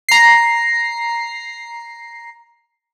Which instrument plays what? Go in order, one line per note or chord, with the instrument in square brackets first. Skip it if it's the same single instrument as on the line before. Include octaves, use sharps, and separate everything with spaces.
[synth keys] A#5 C7